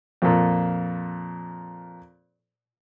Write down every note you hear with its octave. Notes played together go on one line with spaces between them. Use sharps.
F2 A#2